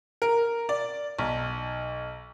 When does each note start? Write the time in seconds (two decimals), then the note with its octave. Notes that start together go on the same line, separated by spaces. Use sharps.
0.22 A#4
0.69 D5
1.19 B1